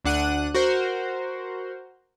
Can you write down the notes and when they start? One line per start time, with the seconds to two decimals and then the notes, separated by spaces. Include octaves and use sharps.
0.05 D2 D4 F#5 F#6 D#7
0.54 F#4 A#4 C5